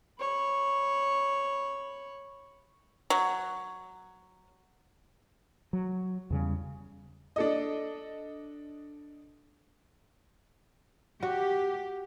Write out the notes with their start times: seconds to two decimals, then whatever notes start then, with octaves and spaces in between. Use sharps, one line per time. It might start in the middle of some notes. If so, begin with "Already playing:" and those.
0.20 C#5 B5
3.10 F#3
5.73 F#3
6.30 E2 C#3 G3
7.36 D4 A4 D#5
11.23 F#4 G4